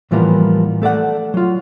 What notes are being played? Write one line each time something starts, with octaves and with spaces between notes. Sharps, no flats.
A2 E3 F3 G3 A#3 B3
A3 A4 D5 F#5
F#3 F4